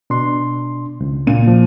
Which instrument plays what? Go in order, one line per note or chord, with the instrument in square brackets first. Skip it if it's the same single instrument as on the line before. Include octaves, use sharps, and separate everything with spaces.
[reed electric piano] B2 D4 C6
C#2
[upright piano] A#2 D#7
[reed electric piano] F3